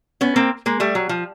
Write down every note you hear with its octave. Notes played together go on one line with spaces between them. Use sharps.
B3 C#4
A#3 C4
G#3 A#3
G3 A3
F#3
F3